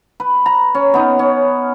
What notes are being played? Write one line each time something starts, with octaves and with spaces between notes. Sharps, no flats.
B4
A#5
C#4
B3 D#4
C#4